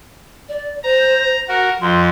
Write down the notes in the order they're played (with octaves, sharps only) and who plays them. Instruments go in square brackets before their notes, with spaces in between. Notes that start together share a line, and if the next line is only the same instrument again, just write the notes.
[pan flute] D5
[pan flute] C5 [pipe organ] A#5
[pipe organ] F#4 A#4 [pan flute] F#5
[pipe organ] F2 [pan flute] C6